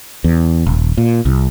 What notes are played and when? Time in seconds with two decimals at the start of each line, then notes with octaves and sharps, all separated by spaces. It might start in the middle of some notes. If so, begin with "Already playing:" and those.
0.24 E2
0.67 D#1
0.98 A#2
1.25 C2